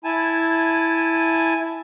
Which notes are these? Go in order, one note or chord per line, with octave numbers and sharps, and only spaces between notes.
E4 G#5 A5